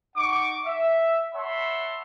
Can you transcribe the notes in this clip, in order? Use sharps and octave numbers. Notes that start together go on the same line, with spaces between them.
D#4 F#5 C#6 D6
E5
C#5 E5 F#5 A5 B5 C6